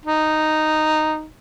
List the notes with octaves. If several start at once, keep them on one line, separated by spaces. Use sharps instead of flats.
D#4